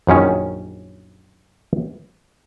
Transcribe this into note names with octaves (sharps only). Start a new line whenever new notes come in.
A#1 F#2 D#3 C#4